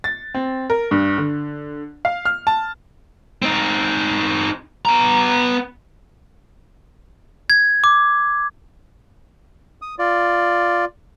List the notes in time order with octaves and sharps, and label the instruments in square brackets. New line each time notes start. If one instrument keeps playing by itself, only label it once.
[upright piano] A6
C4
A#4
G2
D3
F5
F6
A5
[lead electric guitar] C4 D#4
B3 A#5
[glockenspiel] G#6
D6
[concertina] D#6
F4 D5